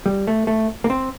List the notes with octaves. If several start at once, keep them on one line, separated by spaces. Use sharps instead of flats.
G3
A3
A3
A#3
C4